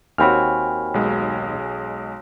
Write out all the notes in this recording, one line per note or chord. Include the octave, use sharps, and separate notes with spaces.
D#2 C4 F#4 C#5 G5 G#5 B5 F6
B1 G#3